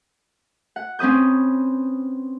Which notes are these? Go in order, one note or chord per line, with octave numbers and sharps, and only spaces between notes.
F#5
C4 C#4 B4 D#6 G6